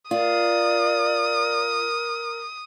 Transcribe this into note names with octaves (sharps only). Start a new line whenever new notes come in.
F4 A#4 D5 D#6